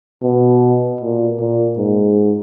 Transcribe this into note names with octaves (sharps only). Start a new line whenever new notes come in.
B2
A#2
A#2
G#2